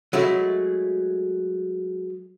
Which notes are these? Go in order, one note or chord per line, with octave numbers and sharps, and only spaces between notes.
F#3 G#3 A3 E4